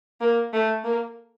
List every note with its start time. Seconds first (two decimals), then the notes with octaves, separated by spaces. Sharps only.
0.21 A#3
0.53 A3
0.84 A#3